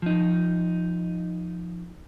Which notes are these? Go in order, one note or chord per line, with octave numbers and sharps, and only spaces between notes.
F3 D#4